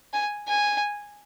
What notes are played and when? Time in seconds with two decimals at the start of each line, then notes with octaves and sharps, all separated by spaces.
0.13 G#5
0.47 G#5